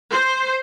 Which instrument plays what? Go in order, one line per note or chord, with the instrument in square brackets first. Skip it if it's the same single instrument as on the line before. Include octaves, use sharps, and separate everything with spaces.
[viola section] C5